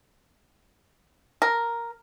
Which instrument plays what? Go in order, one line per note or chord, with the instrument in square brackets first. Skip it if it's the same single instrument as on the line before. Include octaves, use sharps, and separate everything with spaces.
[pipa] A#4